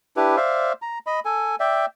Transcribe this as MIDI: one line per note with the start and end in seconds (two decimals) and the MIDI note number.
0.17 0.36 62
0.17 0.36 64
0.17 0.36 67
0.17 0.36 71
0.37 0.73 72
0.37 0.73 74
0.37 0.73 76
0.37 0.73 77
0.82 0.98 82
1.07 1.20 75
1.07 1.20 83
1.25 1.56 69
1.25 1.56 80
1.60 1.86 74
1.60 1.86 76
1.60 1.86 79